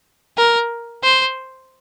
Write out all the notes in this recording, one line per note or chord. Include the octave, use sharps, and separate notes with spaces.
A#4
C5